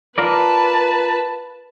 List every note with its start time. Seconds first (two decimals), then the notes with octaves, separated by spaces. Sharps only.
0.18 F4 A#4 B4 D5 A5